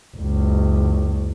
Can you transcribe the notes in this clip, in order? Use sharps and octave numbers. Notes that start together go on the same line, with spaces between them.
F#1 C#2